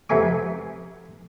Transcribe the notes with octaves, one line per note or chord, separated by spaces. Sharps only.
F2 C3 A3 B3 G#5 D6